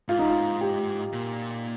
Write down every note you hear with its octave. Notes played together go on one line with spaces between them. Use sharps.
G#2 F4
D#4
F4
G4
A#2